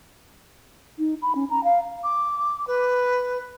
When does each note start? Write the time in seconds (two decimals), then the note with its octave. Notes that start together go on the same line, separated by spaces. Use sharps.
0.99 D#4
1.22 B5
1.35 C#4
1.50 A#5
1.64 F5
2.03 D6
2.67 B4